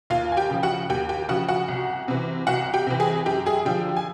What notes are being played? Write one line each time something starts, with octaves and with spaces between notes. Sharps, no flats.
D#2 F4 F5
G#5
G4 G5
C#3 F3
F#4 F#5
D#2 G4 G5
G4 G5
C#3 F3 F#4 F#5
F#4 F#5
C2
C3 E3
C2 F#4 F#5
G4 G5
C3 E3
G#4 G#5
F#2 G4 G5
G#4 G#5
D3 F3 G4 G5
G#5